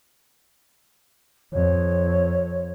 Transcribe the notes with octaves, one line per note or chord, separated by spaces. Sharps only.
F2 C#5